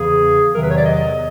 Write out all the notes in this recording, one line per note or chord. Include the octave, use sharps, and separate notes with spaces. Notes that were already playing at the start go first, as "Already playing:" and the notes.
Already playing: E2 C#3 E3 G#4
E2 C3 D#3 F#3 A#4
B4
C#5
D5
D#5